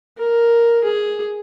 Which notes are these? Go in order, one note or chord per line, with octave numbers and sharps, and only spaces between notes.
A#4
G#4